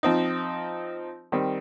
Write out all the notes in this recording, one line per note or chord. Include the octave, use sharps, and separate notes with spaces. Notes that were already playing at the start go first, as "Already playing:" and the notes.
F3 C4 D#4
D#3 G3 C4